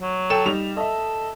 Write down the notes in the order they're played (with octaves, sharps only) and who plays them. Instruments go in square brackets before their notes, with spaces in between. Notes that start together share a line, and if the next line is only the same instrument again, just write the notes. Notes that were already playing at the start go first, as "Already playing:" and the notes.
[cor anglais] F#3
[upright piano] A4 G5 E7
G3 D#4 F7
[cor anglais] A4 [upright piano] D#5 E5